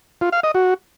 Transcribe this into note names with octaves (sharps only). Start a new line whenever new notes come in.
F4
F5
D#5
F#4